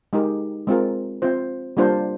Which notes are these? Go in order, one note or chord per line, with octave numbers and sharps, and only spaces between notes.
G#3 D#4 G4 A#4
G#3 C4 F4 A#4
C4 F4 C5
G3 A#3 D4 F4 C5